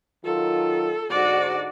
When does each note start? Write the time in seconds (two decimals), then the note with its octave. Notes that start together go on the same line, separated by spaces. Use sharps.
0.25 D#3 F#3 F4 A4
1.10 G#2 D3 F#4 D5